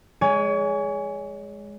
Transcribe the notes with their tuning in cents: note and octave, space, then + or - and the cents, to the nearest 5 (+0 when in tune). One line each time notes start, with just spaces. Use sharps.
G#3 +0 C#5 +35 G#5 +0